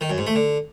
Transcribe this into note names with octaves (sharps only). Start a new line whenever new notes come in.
D#3
F#2
G#2
A3
D3